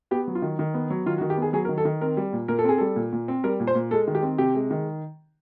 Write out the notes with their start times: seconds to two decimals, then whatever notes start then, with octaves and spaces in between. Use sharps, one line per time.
0.11 B3 G4
0.27 F#3
0.35 F4
0.42 D#3
0.59 D#3
0.74 B3
0.90 F#3
1.06 D#3 F4
1.18 F#4
1.21 D#3
1.30 G4
1.37 B3 G#4
1.53 F#3 G#4
1.65 A#4
1.69 D#3
1.78 A4
1.85 D#3
2.01 C4 A#4
2.17 G3
2.33 A#2
2.48 A#2 A#4
2.59 A4
2.64 C4 G#4
2.78 G3 A4
2.96 A#2
3.13 A#2
3.28 C4
3.44 G3 A#4
3.60 A#2
3.67 C5
3.75 A#2
3.91 G#3 A4
4.07 D#3
4.15 G4
4.23 C4
4.38 C3 G4
4.55 G#3
4.71 D#3